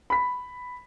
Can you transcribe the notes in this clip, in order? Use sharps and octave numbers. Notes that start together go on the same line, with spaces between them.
B5 B6